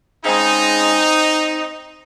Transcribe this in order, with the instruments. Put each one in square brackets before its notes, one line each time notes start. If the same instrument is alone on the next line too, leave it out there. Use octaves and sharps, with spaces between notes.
[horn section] C#3 G#3 C4 D#4